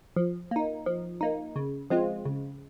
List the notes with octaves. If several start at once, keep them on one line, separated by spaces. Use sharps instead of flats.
F3
A#3 D#4
F3
A#3 D#4
C#3
F3 G#3 C4 F4
C#3